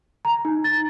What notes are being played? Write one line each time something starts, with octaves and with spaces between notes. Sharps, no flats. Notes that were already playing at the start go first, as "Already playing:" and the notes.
A#5
D#4
A6